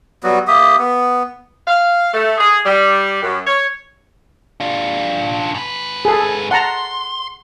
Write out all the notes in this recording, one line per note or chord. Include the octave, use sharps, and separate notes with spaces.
F#3 G3 B3 F#4
A#3 G4 E5 D#6
B3
F5
A3
G#4
G3
F#2
C#5
D4 F4
G#2 B4
G#4 A4
F#5 A5 A#5 C6